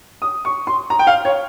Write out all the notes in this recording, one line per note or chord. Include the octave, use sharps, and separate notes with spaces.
D#6
C#6
C6
A#5
G5
F5
C#5